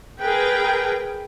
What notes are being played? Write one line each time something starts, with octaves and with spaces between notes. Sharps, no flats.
G#4 A#4 B4 G5